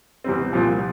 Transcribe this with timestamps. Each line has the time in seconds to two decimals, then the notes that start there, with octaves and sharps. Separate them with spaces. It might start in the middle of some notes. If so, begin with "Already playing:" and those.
0.24 E2 C3 G3 C4
0.53 C2 A#2 F3